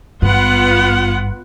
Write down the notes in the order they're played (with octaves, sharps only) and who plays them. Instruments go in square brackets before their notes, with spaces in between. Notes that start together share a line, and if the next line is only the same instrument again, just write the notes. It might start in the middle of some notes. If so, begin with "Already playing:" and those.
[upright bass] G#1 G2 [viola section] B3 F4 F#5